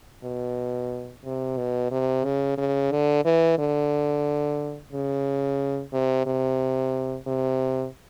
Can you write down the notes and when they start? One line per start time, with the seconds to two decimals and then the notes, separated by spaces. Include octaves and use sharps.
0.24 B2
1.24 C3
1.57 B2
1.91 C3
2.24 C#3
2.58 C#3
2.91 D3
3.25 E3
3.58 D3
4.93 C#3
5.93 C3
6.26 C3
7.27 C3